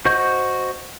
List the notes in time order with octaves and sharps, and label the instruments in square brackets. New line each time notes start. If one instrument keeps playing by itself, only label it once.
[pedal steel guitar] F#4 C5 D#5 C#6 G6